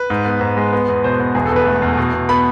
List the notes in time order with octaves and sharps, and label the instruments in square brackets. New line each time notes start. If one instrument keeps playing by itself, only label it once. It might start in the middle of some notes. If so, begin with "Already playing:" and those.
Already playing: [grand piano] B4
G#2
B3
G#2
G#3
B3
E2
B2 C5
B3
E1 G#4
A4
E2 B4
A3
E2
B2
B2
B3 B5